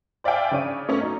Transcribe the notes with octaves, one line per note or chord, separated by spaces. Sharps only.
C5 D5 E5 F5 G5 G#5
C#3 D4 C#5 D#7
A3 B3 C#4
F#3 D4 D#4